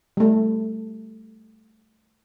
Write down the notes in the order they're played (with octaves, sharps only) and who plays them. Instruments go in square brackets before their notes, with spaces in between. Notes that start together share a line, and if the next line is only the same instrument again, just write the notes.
[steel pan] G3 A3